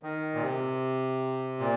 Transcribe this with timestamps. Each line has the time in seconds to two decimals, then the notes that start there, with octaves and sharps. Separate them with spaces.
0.03 D#3
0.34 A#2
0.42 C3
1.59 A#2